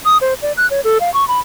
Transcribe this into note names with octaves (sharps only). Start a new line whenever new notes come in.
D#6
C5
D5
F#6
C#5
A4
F5
C#6
B5